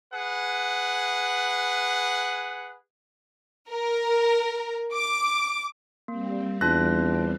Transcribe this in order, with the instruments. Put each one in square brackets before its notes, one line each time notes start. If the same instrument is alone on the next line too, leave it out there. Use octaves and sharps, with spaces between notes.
[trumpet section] G#4 B4 F#5
[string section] A#4
D6
[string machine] G3 C4 [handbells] A#3
[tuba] E2 [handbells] D4 F4 A#6 [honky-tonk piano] F#6